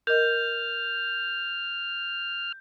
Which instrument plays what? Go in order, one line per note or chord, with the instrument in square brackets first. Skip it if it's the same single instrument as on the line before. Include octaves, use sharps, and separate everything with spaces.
[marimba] A#4 D#5 [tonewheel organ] F6 [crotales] G6